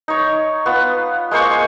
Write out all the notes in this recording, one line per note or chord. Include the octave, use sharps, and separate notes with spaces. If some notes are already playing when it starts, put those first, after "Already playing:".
D#4 C#5
B3 F4
G#3 A#3 C5 C#6
G#5